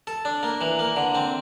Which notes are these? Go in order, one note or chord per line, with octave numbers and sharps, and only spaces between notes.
A4
D4
A#3
E3
A#3
D3
C4